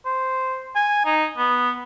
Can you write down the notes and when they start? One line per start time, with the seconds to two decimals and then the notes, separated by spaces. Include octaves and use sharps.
0.06 C5
0.76 G#5
1.05 D#4
1.37 B3